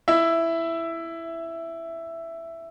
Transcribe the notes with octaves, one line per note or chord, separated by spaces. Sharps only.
E4 E5